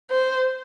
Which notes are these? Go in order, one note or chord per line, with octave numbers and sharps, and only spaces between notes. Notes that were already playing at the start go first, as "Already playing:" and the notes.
C5